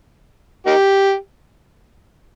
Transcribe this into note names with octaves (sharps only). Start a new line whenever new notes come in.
A#3 D#4 G4